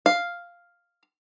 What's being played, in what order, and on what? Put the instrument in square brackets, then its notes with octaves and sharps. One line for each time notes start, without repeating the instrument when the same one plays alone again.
[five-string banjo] F5